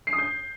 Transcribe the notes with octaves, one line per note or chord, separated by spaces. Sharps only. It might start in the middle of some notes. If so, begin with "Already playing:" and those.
C7
D#6
G6